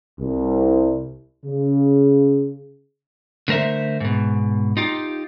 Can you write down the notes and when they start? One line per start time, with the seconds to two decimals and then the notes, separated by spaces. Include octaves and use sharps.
0.19 C2
1.46 C#3
3.48 D3 A3 A#4 C5 E5
4.00 G#2 B2
4.77 D#4 F4 G4